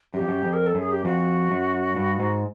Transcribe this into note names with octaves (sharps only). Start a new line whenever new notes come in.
F#2 G4
F2
F#2
F2
A#4
A4
F#2 G#4
G4
F2 F#4
F#2
G2
G#2